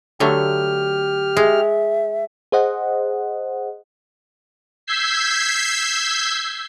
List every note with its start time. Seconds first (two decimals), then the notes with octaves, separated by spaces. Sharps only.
0.20 D3 F#3 A3 G4 F6
1.37 G#3 E5
2.52 G#4 C5 D#5 F#5
4.87 E6 G6 G#6 B6 C7